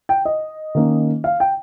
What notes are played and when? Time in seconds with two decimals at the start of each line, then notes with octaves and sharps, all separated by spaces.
0.09 G5
0.25 D#5
0.75 D#3 A#3 C#4
1.24 F5
1.40 G5